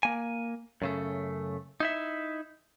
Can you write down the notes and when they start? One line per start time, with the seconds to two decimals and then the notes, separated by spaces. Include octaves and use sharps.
0.03 A#3 G#5
0.82 F#2 C#3 A3
1.80 D#4 E4 E5